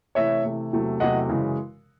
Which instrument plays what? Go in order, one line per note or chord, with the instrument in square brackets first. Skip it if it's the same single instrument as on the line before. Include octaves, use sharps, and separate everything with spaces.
[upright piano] C3 E3 A3 C#5 E5
C3 E3 A3
E2 C3 F#3 A3
E2 C3 F#3 A3 D#5 F#5
F#2 C#3 E3 G#3